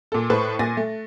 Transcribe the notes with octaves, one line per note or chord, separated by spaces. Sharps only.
A#2 A4
A2 A4 B4 C5 C#6 F#6
A#2 G#5 A6 A#6
A3